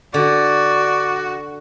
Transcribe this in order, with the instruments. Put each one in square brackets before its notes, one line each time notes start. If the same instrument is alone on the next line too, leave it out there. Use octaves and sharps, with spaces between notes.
[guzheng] D3 [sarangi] F#4 [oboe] D5